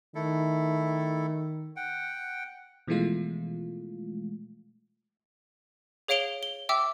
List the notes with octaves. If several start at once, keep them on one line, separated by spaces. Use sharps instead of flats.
D#3 A3 E4 A4
F#5 G5
B2 E3 F3 G#3 A3 F4
G#4 C#5 F5 D7 F7 G7
G7
E5 G5 D6 E6